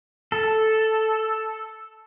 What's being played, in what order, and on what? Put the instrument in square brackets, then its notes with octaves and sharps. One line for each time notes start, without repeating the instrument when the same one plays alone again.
[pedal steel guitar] A4